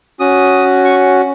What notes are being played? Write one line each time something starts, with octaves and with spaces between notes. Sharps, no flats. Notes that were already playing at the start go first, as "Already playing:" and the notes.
C#4 F#4 D#6
C#6